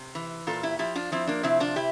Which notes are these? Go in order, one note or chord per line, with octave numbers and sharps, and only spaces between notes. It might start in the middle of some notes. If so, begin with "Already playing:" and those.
Already playing: C3
E3
A#2 F4 A4
E4 G4
F3 E4 G4
D4 F4
F3 C4 E4
A#3 D4
C3 C4 E4
D4 F4
E4 G4